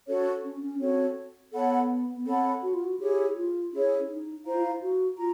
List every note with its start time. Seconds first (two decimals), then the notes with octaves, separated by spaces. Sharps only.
0.08 C#4 F#4 A4 C#5
0.44 C#4
0.62 C#4
0.80 C4 F#4 A4 C#5
1.53 B3 A4 C#5 F#5 B5
2.17 B3
2.26 C4 A4 C#5 F#5 B5
2.63 F#4
2.73 F4
2.84 F#4
2.99 E4 G4 G#4 C#5
3.36 F4
3.72 C#4 E4 G#4 C#5
4.09 D#4
4.45 E4 C5 F5 A#5
4.54 F4
4.62 E4
4.82 F#4
5.18 F4 A#5